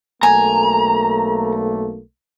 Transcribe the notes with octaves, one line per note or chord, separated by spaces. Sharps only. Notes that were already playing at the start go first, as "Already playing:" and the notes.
B1 A3 A#3 G#5 A#5